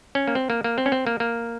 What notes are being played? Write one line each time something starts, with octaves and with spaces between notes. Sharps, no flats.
C#4
A#3
C4
A#3
A#3
C4
C#4
C4
A#3
A#3